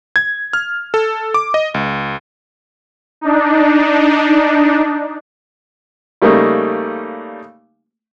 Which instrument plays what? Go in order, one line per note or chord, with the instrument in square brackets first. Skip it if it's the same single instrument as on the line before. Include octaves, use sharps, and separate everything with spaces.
[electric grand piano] G#6
F6
A4
D6
D#5
C#2
[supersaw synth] D4 D#4
[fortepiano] C#3 G3 A3 A#3 D#4